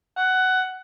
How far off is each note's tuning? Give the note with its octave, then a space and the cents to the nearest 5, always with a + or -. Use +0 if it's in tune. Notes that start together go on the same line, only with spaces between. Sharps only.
F#5 +15